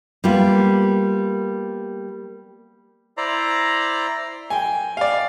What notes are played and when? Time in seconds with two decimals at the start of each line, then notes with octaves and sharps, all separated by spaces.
0.24 G3 A#3 B3 F4
3.17 E4 C5 D5 A#5
4.50 G5 G#5
4.97 D5 F5